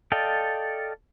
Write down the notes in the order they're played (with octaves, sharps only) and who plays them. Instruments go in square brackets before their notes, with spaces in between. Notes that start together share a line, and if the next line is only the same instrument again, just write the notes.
[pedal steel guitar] A4 D5 D#5 F5 G5